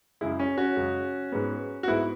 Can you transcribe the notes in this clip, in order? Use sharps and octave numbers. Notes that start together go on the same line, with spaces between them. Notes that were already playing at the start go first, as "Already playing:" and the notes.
F#2 C#3 G#3 E4
C#4
C#4 F#4
F#2 C#3 G#3
G#2 G#3 B3
F#4
G#2 G#3 B3 E4